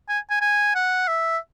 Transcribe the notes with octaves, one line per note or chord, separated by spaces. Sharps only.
G#5
G#5
G#5
F#5
E5